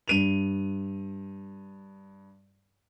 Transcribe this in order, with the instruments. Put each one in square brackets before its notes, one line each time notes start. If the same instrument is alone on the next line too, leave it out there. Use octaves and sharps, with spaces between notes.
[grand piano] G2 D#7 F7